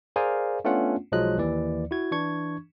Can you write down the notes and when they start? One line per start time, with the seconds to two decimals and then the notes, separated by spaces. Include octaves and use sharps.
0.16 G#4 A#4 C5 D5 F5 G#5
0.65 A3 B3 C#4 D4 F4 F#5
1.12 B1 F3 F#3 G#3 D#5 F#6
1.38 D#2 E3 D5
1.91 E4 F#4 G#6
2.11 E3 D4 C#6 G#6